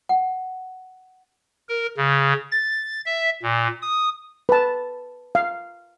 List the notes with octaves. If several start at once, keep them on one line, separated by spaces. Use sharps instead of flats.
F#5
A#4
C#3
A6
E5
A#2
D#6
B4 A5
F5